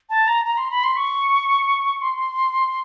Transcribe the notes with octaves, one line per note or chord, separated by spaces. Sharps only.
A5
A#5
A#5
C6
B5
C6
C#6
C6